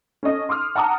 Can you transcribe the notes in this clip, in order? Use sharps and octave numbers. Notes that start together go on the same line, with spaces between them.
C#4 A4 D#5
C6 D6 D#6 F6
F#5 A5 A#5 D6 D#6